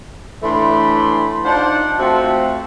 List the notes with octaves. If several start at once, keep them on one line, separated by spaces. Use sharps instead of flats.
A2 E3 A3 D4 B5 C6
D4 D#4 F4 C5 D5 F#5
A3 C4 F4 F#4 E5